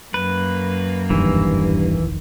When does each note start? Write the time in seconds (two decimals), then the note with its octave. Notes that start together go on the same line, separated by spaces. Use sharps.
0.14 F#2 A#3 B4
1.10 E1 A#1 G2 D#3 E3